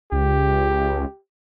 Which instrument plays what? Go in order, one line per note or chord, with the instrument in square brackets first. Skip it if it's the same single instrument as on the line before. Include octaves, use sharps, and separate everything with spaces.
[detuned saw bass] C#2 [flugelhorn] G4